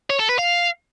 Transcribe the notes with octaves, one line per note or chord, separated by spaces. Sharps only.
C#5
A4
B4
F5